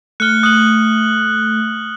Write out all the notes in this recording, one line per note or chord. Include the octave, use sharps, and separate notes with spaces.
A3 F6 F#6 C#7 G7
D#6 F#6 F#7